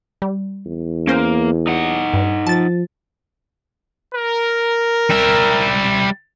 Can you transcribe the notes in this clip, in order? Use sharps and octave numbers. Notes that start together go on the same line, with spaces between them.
G3
E2
A#3 C#4 A#4 C5
D#4 F#5
G2
F3 A5 A6
A#4
G3 E5